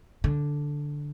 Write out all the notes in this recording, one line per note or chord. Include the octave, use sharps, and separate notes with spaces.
D3